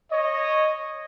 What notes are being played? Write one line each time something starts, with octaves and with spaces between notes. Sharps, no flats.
C#5 D#5